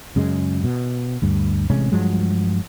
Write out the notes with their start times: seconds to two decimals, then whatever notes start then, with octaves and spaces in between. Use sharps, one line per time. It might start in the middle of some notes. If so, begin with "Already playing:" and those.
0.16 F#2 C#3 G#3
0.64 B2
1.22 D2 G2
1.70 A1 C3 G#3 C#4
1.92 G2 F3 F#3 G#3